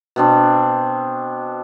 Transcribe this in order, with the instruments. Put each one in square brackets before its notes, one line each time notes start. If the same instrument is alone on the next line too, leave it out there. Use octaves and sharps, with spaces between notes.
[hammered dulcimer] B2 C4 D4